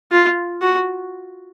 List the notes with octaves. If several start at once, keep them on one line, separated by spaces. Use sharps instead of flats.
F4
F#4